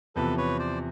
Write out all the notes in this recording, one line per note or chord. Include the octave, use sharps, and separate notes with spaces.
E2 C3 F3 A4 B4
B4 C#5
C5 D5